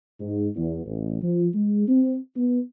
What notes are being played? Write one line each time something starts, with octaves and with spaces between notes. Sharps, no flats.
G#2
E2
A1
F3
G#3
C4
B3